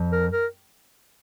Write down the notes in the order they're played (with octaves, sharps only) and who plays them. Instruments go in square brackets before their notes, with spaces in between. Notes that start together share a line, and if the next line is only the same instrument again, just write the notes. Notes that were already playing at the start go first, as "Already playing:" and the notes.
Already playing: [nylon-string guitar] F2
[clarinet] A#4
A#4